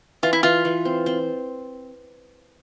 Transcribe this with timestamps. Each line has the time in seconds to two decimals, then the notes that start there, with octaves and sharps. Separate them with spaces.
0.23 E3 F4
0.33 E4
0.43 E3 F4
0.65 E3
0.85 C4
1.06 C4